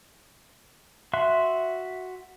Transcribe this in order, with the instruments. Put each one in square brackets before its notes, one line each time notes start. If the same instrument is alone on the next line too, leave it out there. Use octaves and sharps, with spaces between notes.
[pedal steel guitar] F#4 E5 C6 F#6